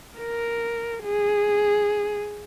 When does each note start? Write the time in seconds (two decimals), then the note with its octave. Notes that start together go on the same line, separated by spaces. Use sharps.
0.19 A#4
1.04 G#4